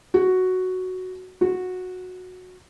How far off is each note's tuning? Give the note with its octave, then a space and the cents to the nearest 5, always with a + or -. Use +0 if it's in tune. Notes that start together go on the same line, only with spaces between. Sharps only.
F#4 +0
F#4 -15